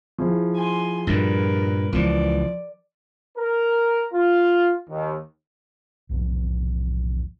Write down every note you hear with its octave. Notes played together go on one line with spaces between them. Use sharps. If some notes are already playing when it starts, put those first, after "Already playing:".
F3 E4 G#4
G#5 C6
G2 A#2 G3 A#4 B4
C#2 E3 F3 D5
A#4
F4
D#2
B1 E2 A2 F3